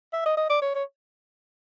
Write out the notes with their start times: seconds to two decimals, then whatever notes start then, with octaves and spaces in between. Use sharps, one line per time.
0.13 E5
0.25 D#5
0.37 D#5
0.49 D5
0.62 C#5
0.75 C#5